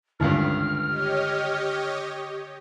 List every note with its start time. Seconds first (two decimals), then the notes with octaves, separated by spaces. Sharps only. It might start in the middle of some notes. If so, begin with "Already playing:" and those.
0.20 G#1 C#2 G2 D3 E4 F6
0.86 G4 C#5 D#5